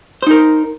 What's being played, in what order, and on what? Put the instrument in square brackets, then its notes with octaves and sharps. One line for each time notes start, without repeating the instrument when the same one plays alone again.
[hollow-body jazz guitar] C5
D#4
A#4